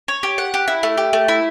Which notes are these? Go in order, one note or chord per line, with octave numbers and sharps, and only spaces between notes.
C#5
G4
F#5
G4
E4
A3
G4
A3
E4